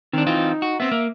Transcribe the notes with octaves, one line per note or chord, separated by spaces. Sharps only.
D#3 C4 D4
E3 C4 D#4 F4
F#4
B3 C4 E5
A#3